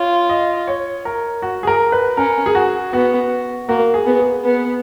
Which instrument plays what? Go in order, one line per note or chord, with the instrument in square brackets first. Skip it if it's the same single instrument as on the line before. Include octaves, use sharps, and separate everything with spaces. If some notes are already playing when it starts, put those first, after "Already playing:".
Already playing: [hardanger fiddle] F4 [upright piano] C#5
[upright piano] D#5
C#5
A#4
F#4
G#4
A#4
B4
[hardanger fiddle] C#4 [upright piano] A#4
[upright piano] G#4
F#4
[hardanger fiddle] B3 [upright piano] F#4
[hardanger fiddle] A#3 [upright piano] F#4
[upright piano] G#4
[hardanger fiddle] B3
[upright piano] G#4
[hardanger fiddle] B3